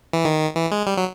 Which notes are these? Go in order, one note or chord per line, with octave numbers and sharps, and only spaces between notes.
E3
D#3
E3
G#3
G3
F#3